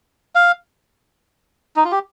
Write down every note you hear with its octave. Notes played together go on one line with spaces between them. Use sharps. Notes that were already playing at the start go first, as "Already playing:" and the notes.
F5
D#4
F4
G4